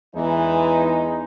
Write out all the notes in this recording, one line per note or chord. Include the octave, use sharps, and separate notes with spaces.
E2 E3 G#3 D#4